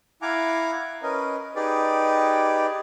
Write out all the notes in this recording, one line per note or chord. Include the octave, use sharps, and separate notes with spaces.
E4 F5 F#5 G#5 A#5 D6
C#4 A#4 B4 D#5
D#4 G4 G#4 B4 D5